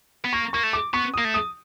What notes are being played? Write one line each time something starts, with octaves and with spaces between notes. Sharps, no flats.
B3
A#3 C#6
A#3 C#6
A3
D6
B3 C#6
A#3 D#6
A3
D#6